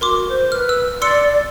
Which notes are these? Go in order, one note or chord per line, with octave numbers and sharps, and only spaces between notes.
F#4 A#4 C6 D6
C5
B4 F6
E6
D5 C6 E6 C#7